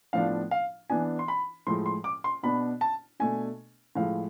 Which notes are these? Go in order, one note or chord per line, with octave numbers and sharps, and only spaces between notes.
A2 F3 B3 D4 F5
F5
E3 B3 D4 G#5
C6
B5
A2 F3 G#3 C6
C6
D6
C6
B2 B3 D4 B5
A5
B2 A3 D4 G#5
A2 F3 G#3 F5